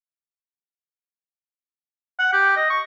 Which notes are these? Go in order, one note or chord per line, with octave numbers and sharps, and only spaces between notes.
F#5
G4
D#5
C#6